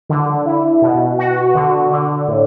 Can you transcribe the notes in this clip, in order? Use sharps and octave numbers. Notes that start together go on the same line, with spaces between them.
D3
E4
B2
F#4
D3
D3
A2